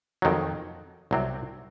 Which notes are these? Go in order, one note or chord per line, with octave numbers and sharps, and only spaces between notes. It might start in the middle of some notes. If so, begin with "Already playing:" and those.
F2 D#3 F#3
C2 C3 F#3 C4